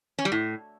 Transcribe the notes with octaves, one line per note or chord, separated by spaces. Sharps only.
C#4
G3
A2